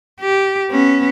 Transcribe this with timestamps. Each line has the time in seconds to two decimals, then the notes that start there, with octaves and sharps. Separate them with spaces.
0.21 G4
0.71 B3 C#4